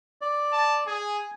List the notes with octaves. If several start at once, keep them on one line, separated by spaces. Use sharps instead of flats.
D5
A5
G#4 G#5